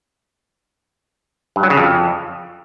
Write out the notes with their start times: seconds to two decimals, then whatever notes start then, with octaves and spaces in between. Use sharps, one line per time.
1.56 G2
1.63 F#3
1.70 C#3
1.77 F2